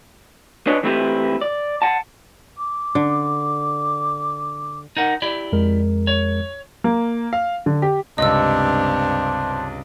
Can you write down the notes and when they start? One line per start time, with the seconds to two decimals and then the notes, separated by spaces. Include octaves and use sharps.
0.67 D4 B4 C#5 D#5
0.83 E3 A3 C4 E4 G4 B4
1.41 D5
1.82 F#5 A5
2.58 D6
2.95 D3
4.97 D#4 A#4 F#5
5.22 E4 G4 D5
5.52 F2 G#3 A#4
6.07 C#5
6.84 A#3
7.33 F5
7.66 D3
7.82 G4
8.18 C#2 G2 C3 C4 D4 C5 D#5 E6